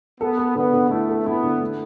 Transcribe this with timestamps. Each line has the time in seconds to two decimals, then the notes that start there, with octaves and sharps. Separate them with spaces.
0.21 B3 A4
0.38 A4
0.55 D3 B3
0.74 D3
0.90 A3 E4
1.09 A4
1.26 B3 E4
1.43 D3
1.61 A3